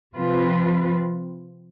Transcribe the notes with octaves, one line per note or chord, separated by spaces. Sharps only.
C3 F3 C4 F4 B4